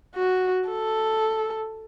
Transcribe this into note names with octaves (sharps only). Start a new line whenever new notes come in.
F#4
A4